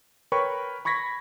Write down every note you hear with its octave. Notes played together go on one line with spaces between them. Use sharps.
A#4 B4 C#5 G5 B5 C#6
B5 C#6 G#6 A#6 B6